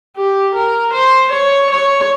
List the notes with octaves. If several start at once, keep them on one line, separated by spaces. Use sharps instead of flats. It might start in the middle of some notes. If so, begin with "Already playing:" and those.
G4
A#4
C5
C#5
C#5